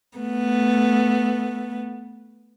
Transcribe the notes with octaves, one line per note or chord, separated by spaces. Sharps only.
A3 B3